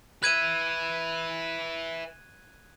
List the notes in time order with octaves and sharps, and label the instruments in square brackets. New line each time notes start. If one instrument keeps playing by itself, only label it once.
[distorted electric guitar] B4 E5 [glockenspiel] F#6 G#6 D#7